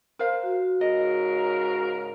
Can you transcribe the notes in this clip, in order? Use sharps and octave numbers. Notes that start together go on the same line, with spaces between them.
A#4 C5 F5
F#4
G#2 C#3 A#4 D#5